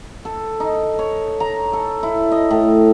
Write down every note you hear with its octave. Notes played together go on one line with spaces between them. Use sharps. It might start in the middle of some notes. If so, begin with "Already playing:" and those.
A4
D#4
C#5
A#5
A4
E4
D#5
A2